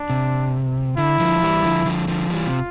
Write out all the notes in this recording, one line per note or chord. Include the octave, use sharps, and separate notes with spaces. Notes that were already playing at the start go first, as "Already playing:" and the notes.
Already playing: D4
C3
D3 E4
D3 F3
E3 G3
D3 F3
D3 F3
D3 F3
E3 G3 F4
C3